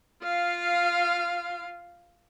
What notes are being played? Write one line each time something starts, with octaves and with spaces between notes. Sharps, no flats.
F4 F5